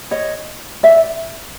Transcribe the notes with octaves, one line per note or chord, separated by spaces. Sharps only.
C#5 D#5
D5 E5